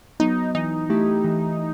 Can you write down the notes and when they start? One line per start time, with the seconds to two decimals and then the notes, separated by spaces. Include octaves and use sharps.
0.20 F#3 B3 D#4
0.55 E3 D#4
0.90 A3 E4 G4
1.24 E3